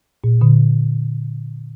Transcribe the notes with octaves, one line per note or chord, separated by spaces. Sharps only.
A#2
A#2 D3